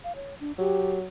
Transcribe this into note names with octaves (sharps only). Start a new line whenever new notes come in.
F5
C#5
D4
F#3 G4